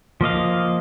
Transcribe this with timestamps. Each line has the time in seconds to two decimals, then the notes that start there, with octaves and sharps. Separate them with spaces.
0.21 F3 A#3 D#5 F5